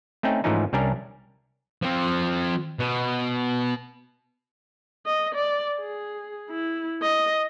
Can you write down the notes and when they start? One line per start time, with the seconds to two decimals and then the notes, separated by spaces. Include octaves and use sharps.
0.23 A3 C4 C#4 D#4 G5
0.44 G#2 E3 F3 A3 C#4 D#4
0.73 C2 G3 C#4 D4 A#4 D5
1.82 F3 C4
2.79 B2
5.06 D#5
5.34 D5
5.80 G#4
6.50 E4
7.02 D#5